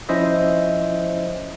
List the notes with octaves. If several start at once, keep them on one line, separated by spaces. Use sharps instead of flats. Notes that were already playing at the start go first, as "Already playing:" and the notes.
F3 C#4 E4 C5 D#5 E5